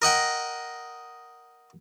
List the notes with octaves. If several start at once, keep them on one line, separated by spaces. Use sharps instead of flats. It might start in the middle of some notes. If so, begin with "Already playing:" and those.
A#4 D#5 F#5 G5